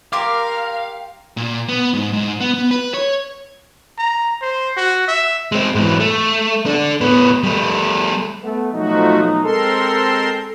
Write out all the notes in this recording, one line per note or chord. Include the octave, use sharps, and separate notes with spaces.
A#3 G4 A#4 F5 C6 D6
A#2
B3
G#2
G#2
B3
B3
B4
C#5
A#5
C5
F#4
E5
G#3 C4
G#2 E3
A3
D4 A4
A2 B3
G3 A3
A3 B3
B2 F3 F#3 A3 D#4 F#4
G#3 C4 A4 A#4 C6